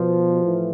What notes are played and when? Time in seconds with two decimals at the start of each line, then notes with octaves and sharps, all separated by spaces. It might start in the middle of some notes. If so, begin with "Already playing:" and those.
Already playing: B2 F3
0.41 A2 E3